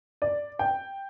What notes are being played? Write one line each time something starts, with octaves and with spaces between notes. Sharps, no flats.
D5
G5